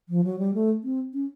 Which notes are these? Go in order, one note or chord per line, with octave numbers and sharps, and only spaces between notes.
F3
F#3
G3
A3
C4
C#4